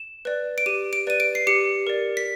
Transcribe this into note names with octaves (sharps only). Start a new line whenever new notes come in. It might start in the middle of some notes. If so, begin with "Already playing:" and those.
Already playing: E7
B4 D5
D7
G4 D#7
D7
B4 D5 D#7
D7
C7
G4 C#7
A#4 D5
B6